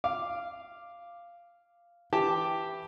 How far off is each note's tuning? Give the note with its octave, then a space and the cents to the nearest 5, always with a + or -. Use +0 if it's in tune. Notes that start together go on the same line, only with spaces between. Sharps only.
F5 -10 D6 +5
E3 +0 G4 +0 A5 +0